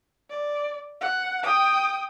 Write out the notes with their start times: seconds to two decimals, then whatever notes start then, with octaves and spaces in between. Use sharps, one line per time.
0.30 D5
1.01 F#5
1.43 G5 D#6